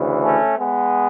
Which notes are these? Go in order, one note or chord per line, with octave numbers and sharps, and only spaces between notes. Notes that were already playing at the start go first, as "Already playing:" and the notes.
Already playing: D2 C#3 E3
A3 C#4
G#3 B3